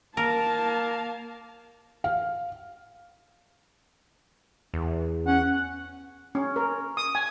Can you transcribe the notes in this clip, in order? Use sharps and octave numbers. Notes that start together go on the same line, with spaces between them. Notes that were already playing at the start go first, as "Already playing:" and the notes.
A#3 A#4 A5
F5
E2
C#4 F#5
C#4
A#4
D#6
G#5